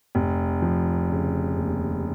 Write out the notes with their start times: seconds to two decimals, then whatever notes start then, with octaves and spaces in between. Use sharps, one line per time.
0.15 F1
0.62 F3
1.10 C#3
1.57 D#2